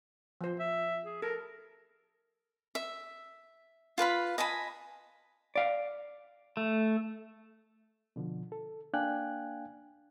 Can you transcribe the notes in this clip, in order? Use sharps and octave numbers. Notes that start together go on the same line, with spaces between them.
F3 C5
E5
G#4
A4 A#4
E5
F4 B4 F5 B5
D#5 G#5 A5 B5
D5 F5
A3
B2 D3 F3
A4
A#3 D4 F5 G5 G#5 F#6